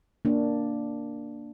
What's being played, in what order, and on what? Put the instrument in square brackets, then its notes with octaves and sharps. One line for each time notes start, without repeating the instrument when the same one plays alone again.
[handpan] A#3 D4